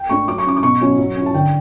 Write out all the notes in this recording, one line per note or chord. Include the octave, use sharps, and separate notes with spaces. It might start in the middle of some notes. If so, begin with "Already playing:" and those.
Already playing: G5
A3 D4 C#6
F#3 D6
C#6
C#4 E4 D6
D6
B2 C#6
F#3 C#4 E4
F#3
C#4 E4
A5
D3 G5